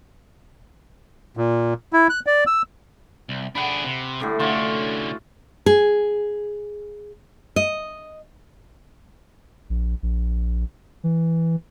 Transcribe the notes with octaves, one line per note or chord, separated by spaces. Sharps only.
A#2
E4
F#6
D5
E6
C2
D4 G#4 F#5 B5
C3
A2 D3 G3
D3 C#4 F4 F#4 C#5
G#4
D#5
A#1
A#1
E3